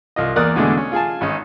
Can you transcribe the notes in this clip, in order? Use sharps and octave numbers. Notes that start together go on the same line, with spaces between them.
C2 F4 D#5
E2 A#3 A#4 D5 D#6 F#6
E2 B2 D3 G#3 A3 D4
C#4
F4 G#4 G#5 A5
G#1 C#4 D#4